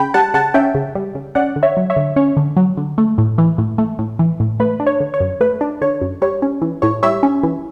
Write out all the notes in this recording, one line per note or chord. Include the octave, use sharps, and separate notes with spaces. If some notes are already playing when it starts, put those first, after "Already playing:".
Already playing: C#3 G5 B5
G3 F#5 A5
C#3 F#5 A5
C#4 E5 G5
C#3
G3
C#3
C#4 D5 F#5
D3
C#5 E5
F#3
C#5 E5
D3
C#4 C#5
D3
F#3
D3
A3
A2
E3
A2
A3
A2
E3
A2
A3 B4
D4
C#5
D3
C#5
F#2
A3 B4
D4
D3 C#5
F#2
G3 C#5
C#4
E3
A2 C#5
G3 C#5 E5
C#4
E3